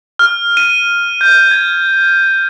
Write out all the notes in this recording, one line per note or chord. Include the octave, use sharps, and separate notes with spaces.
F6
D#7
G6
G#6